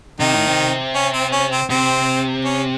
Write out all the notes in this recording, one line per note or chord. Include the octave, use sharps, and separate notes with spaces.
C3 D#3 D#4
A2
C3
C#4
C4
C#4
C4
C3 C4
C#4